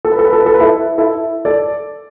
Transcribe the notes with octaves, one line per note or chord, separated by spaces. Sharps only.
A4
B4
A4
B4
A4
B4
A4
B4
E4 A4
E4 A4
A4 D5